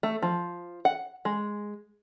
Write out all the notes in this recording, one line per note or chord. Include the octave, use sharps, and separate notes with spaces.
A3
F3
F#5
G#3